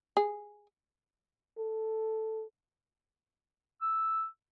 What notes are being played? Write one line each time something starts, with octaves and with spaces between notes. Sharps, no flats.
G#4
A4
E6